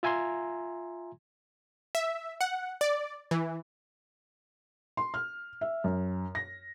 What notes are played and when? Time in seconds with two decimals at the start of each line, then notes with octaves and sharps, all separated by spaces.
0.03 F4 E5 G#5 A#5 C6
1.95 E5
2.41 F#5
2.81 D5
3.31 E3
4.97 C6
5.14 F6
5.61 E5
5.84 F#2
6.35 A#6